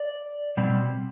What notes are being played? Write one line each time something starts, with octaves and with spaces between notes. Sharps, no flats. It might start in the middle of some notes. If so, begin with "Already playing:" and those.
Already playing: D5
B2 G3 C4